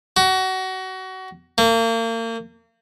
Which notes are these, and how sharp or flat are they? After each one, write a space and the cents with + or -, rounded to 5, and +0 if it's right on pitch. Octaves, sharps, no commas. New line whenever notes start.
F#4 +25
A#3 -35